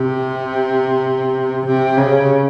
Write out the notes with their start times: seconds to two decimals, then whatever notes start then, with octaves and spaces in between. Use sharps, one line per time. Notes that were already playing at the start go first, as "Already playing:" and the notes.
Already playing: C3
1.66 C3
1.97 C#3